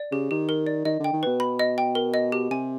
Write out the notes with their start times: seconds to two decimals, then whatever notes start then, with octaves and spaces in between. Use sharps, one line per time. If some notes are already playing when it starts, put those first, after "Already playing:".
Already playing: D5
0.11 C#3 G4
0.31 D#3 G4
0.49 A#4
0.67 D5
0.85 D#3 D#5
0.99 D3
1.04 G5
1.13 D#3
1.23 B2 B4
1.40 B5
1.59 D#5
1.78 G5
1.95 A#4
2.14 D#5
2.32 G4
2.50 C3 G#5